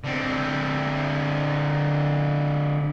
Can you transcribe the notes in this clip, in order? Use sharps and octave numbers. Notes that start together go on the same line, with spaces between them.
D3 C4